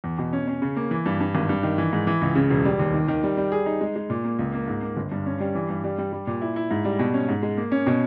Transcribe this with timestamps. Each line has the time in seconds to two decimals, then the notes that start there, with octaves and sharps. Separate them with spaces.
0.04 E2
0.18 B2
0.33 C#4
0.47 C#4
0.62 C#3
0.76 A#3
0.91 E3
1.06 G2
1.20 G2
1.35 G#1
1.49 G2
1.63 D#3
1.78 E3
1.93 G#2
2.07 E3
2.21 C#2
2.35 C#3
2.50 E1
2.65 G3
2.79 D#2
2.94 D#3
3.08 D#3
3.23 G3
3.37 G3
3.52 G#4
3.66 D#4
3.81 G#3
3.96 G#3
4.10 A#2
4.25 A#3
4.39 C#2
4.53 A#3
4.67 G#2
4.82 A#3
4.97 G1
5.11 G2
5.26 C#4
5.40 G3
5.55 E3
5.70 G2
5.84 G3
5.98 G3
6.13 G3
6.27 A#2
6.41 E4
6.56 E4
6.71 G#2
6.85 G3
6.99 B2
7.14 C#4
7.29 G#2
7.43 G#3
7.57 A#3
7.72 C#4
7.87 B2